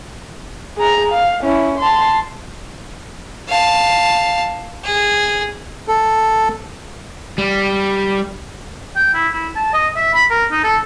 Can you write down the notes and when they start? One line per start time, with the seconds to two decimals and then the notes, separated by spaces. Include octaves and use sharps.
0.77 G#4 A#5
1.12 F5
1.44 C#4 E4
1.79 A5 C6
3.48 F5 A5
4.84 G#4
5.88 A4
7.38 G3
8.96 G5
9.14 E4
9.33 E4
9.56 A5
9.73 D#5
9.96 E5
10.13 B5
10.30 A#4
10.51 D#4
10.64 A4